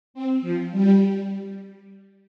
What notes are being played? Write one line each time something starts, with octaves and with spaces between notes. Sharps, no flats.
C4
F3
G3